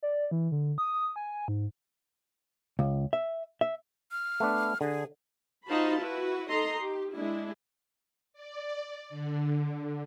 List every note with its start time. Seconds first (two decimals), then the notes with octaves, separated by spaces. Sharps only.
0.03 D5
0.31 E3
0.52 D3
0.78 D#6
1.16 G#5
1.48 G#2
2.79 C#2
3.13 E5
3.61 E5
4.11 F6
4.40 A3 B3 D4
4.81 D3 G#4
5.66 D#4 F4 F#4 C5 A5 B5
5.99 E4 F#4 B4
6.49 D#4 A4 D#5 A#5 C6
6.81 G4
7.13 G#3 D4 E4
8.33 D5
9.10 D3